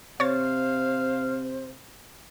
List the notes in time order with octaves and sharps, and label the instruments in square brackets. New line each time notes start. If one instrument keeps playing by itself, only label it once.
[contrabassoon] C3 [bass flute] C5 [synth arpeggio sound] C#5 A6 [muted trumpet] F5